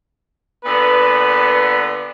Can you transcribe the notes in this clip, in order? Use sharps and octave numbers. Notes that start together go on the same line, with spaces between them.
A#2 D3 B3 B4